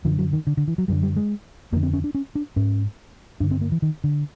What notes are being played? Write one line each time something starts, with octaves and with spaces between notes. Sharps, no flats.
F#2 D3 F3
F#3
D#3
D3
D3
E3
F#3
F#2 D3 G3
G3
G#3
F2 D3 A#3
C4
C#4
D4
C#4
D4
G#2 C#4
G2 D3 D4
C4
A#3
E3
D#3
D3